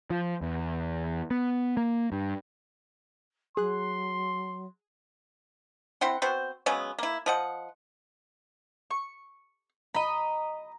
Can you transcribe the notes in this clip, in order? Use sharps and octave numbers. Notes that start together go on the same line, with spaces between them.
F3
E2
B3
A#3
G2
F#3 G#4 C6 F#6
C4 E4 F#5 C6
B3 C4 F#4 C5
C#3 F#3 G#3 B3
A#3 E4
F3 D#5 F#5
C#6
D#5 A#5 B5